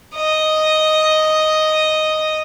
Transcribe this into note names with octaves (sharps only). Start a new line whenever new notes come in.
D#5